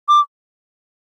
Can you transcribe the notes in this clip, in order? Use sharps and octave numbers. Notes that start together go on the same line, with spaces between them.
D6